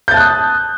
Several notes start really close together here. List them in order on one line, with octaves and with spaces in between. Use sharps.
G6 A6 A5 F#6 D#6